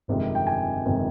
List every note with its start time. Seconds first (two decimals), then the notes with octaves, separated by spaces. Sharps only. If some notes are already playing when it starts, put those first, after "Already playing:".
0.08 G1 F2 C3 D#3 G#3
0.35 G5
0.47 G#5
0.85 G1 F2 C3 D#3 G#3